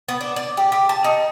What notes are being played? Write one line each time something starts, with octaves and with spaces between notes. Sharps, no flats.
B3
D4
D5
G4
G4
A5
D#4